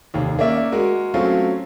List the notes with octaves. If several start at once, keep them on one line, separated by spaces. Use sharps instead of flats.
F1 D#2
A#3 C#4 D5 E5
G#3 F#4 A#4
F#3 A3 C4 C#4 F4